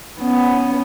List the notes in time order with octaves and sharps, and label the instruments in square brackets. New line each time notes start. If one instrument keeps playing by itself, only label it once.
[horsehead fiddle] B3 C#4